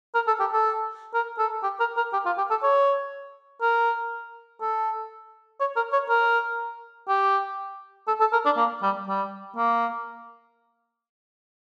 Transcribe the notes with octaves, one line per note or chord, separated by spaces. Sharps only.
A#4
A4
G4
A4
A#4
A4
G4
A#4
A#4
G4
F4
G4
A4
C#5
A#4
A4
C#5
A#4
C#5
A#4
G4
A4
A4
A#4
D4
A#3
G3
G3
A#3